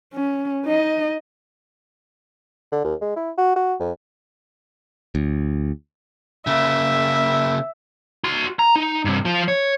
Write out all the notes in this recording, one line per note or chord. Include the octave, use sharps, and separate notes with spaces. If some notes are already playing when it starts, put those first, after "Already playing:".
C#4
D#4 D#5
D3
D#2
G#3
E4
F#4
F#4
F2
D2
C#3 A#3 E5
F#4 C6
A#5
D#4
G2 C3
F3 F4
C#5